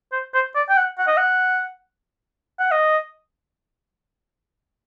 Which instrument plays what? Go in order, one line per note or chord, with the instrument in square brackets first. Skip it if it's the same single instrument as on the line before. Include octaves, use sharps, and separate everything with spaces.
[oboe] C5
C5
D5
G5
F#5
F#5
D#5
F#5
F#5
D#5